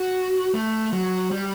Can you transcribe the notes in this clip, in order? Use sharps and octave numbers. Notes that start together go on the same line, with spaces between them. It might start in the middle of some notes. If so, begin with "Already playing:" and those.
Already playing: F#4
A3
F#3
G3